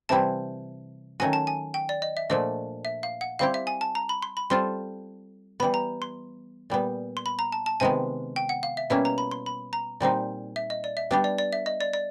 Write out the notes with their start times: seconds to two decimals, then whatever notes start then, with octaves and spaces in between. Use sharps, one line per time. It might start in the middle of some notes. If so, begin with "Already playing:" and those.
0.09 C3 E3 G3 C4 E4 A5
1.20 D#3 F#3 A3 C#4 F#4 G#5
1.33 A5
1.47 G#5
1.74 G5
1.89 D5
2.02 D#5
2.17 E5
2.30 A#2 F3 A3 D4 D#5
2.85 E5
3.03 F5
3.21 F#5
3.39 G3 C4 E4 G4 F5
3.54 E5
3.67 G#5
3.81 A5
3.95 A#5
4.09 B5
4.22 C6
4.37 B5
4.50 G3 C4 F4 A4 C6
5.60 E3 G3 B3 B5
5.74 A#5
6.02 C6
6.70 A#2 G3 B3
7.17 C6
7.26 B5
7.39 A#5
7.52 A5
7.66 A5
7.80 C3 D#3 G#3 B3 G#5
8.36 G5
8.49 F#5
8.63 F5
8.77 E5
8.90 B2 G3 A#3 C#4 E4 E5
9.05 A#5
9.18 B5
9.31 C6
9.46 B5
9.73 A#5
10.00 A#2 G3 C4 D#4
10.56 E5
10.70 D#5
10.84 D5
10.97 E5
11.11 G3 B3 D4 G4
11.24 D5
11.38 D5
11.53 E5
11.66 D#5
11.81 D5
11.93 D5